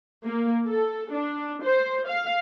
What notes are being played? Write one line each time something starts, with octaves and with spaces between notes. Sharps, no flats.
A#3
A4
D4
C5
F5